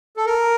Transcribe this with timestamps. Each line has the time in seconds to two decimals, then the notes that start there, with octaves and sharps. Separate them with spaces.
0.17 A4
0.26 A#4